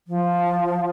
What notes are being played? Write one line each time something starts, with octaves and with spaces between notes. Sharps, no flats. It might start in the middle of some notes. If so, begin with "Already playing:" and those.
F3